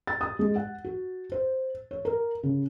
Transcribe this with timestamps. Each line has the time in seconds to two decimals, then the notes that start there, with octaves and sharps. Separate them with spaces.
0.07 A6
0.21 D#6
0.39 G#3
0.56 F#5
0.84 F#4
1.32 C5
1.91 C#5
2.05 A#4
2.43 C#3